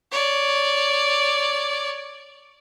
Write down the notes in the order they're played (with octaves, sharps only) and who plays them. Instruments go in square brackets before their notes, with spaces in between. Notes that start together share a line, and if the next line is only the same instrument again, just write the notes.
[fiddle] C#5 D5